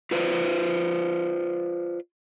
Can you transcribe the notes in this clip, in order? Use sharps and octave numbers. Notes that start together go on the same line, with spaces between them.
F4 B4 C5 D5